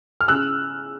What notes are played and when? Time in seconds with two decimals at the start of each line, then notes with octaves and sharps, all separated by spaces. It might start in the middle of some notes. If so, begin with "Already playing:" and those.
0.21 F6
0.28 C#3 E6 F#6